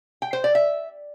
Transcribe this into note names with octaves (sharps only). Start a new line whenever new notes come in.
G5
C5
D5
E5